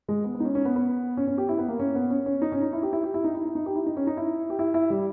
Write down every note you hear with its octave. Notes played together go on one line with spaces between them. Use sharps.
G#3
B3
B3
D#4
C#4
C#4
B3
B3
C#4
C#4
G4
E4
B3
A#3
C#4
B3
C#4
C#4
D#4
C#4
D#4
E4
G4
E4
G4
E4
D#4
E4
E4
D#4
G4
E4
D#4
C#4
D#4
E4
G4
E4
E4
G3